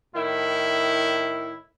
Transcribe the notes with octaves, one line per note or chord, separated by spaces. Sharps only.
A2 D#3 E4